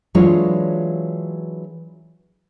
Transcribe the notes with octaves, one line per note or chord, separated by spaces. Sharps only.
E3 F#3 G#3 D4 F4 C#5